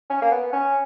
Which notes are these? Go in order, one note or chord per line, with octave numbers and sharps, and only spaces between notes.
C#4
A#3
B3
C#4